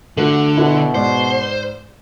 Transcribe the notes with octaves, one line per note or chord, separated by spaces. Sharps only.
D3 A3 F#4
B2 E4 F#4 A4
G#2 C5 D5